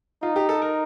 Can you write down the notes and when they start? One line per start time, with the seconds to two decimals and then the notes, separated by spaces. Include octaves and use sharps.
0.23 D#4 F4
0.36 G4
0.49 A4
0.62 A#4